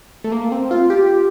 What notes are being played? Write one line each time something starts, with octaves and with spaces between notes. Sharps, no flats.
A3
A#3
C4
F4
G4